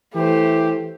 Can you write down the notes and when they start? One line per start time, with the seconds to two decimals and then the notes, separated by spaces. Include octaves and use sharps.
0.16 E3 A3 G4 C5